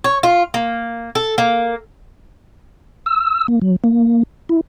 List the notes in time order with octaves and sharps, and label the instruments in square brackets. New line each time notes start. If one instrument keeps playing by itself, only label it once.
[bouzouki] C#5
F4
A#3
A4
A#3
[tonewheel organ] E6
A#3
F#3
A#3
E4